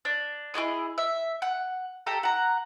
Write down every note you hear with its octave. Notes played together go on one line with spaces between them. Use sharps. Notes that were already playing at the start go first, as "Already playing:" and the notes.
D4
E4 F#4 G#4 D#5
E5
F#5
G4 A4 A#5
F#5 A#5